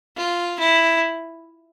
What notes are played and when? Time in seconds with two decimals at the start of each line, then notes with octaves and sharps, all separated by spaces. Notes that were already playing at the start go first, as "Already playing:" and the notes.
0.17 F4
0.59 E4